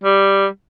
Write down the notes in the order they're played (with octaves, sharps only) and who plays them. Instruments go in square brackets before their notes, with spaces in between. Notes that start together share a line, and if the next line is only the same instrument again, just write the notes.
[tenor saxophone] G3